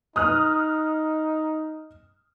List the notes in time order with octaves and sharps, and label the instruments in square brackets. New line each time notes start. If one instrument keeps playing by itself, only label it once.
[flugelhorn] D#4 [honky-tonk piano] D#6 F6 F#6